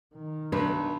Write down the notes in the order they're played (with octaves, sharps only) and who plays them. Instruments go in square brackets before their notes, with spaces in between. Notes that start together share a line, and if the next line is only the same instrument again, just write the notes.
[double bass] D#3
[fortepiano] B1 [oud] D4 [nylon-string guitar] B4